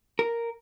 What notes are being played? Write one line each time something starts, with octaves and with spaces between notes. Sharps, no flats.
A#4